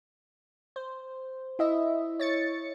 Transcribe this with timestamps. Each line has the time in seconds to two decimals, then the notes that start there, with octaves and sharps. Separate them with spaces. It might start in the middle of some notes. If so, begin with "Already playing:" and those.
0.76 C5
1.59 E4 D#5 E5
2.20 C#5 A6 C#7